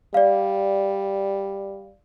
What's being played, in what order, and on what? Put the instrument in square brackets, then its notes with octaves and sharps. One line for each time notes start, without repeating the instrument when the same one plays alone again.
[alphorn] G3 [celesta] D5 F5